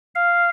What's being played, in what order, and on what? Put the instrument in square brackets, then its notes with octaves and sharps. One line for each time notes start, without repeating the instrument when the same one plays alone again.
[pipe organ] F5